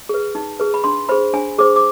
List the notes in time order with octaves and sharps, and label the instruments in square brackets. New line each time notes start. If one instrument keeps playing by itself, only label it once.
[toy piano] G#4 B4
D#4
G#4 B4
B5
D4 C6
G#4 C5 B5
D4 G#5
G#4 C5 D6
D6